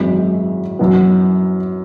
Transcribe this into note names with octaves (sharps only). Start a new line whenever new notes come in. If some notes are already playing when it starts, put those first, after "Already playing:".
Already playing: G#1 F#2 E3 G#3 E4
F#2 E3 B3